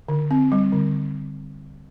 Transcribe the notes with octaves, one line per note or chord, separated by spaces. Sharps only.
D3
C4
G3
D3